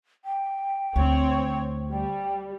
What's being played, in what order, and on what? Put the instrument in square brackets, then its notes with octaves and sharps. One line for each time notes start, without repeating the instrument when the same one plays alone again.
[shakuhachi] G5
[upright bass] D2 [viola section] C4 C#5
[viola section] G3 [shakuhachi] G5